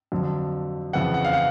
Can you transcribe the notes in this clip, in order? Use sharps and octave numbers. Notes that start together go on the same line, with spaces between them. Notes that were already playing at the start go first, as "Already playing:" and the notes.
F2 D3 F#3
F2 C#3 E3 F#5
F#5
F5
F#5